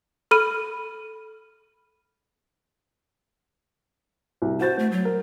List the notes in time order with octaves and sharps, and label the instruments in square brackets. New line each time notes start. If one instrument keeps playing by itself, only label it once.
[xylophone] A4 B5 F6 D#7
[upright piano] C2
[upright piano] F#4 A6 [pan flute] C5
[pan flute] A3
F#3
[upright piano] A#4